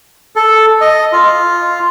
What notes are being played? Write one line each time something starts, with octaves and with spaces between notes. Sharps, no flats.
A4
D#5
F4